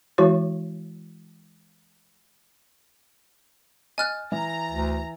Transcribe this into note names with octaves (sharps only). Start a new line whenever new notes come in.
E3 G#3 E4 F#4 C#5
D#5 G#5 F6 F#6 A6
E3 A#5
D2